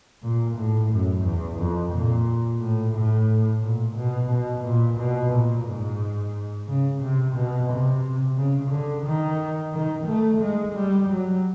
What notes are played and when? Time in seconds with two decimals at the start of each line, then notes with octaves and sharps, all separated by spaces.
0.23 A#2
0.57 A2
0.91 F#2
1.24 E2
1.58 F2
1.93 A#2
2.60 A2
2.94 A2
3.62 A#2
3.96 B2
4.30 B2
4.64 A#2
4.98 B2
5.32 A#2
5.66 G#2
6.67 C#3
7.01 C3
7.35 B2
7.70 C3
8.37 C#3
8.71 D3
9.05 D#3
9.74 D#3
10.07 A3
10.41 G#3
10.75 G3
11.08 F#3